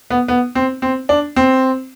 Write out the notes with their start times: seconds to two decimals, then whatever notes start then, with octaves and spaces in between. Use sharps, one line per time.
0.10 B3
0.28 B3
0.55 C4
0.82 C4
1.09 D4
1.36 C4